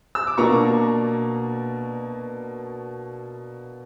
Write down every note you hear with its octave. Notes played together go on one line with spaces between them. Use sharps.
E6
D6
B2 A#3 D4 A#5 C#6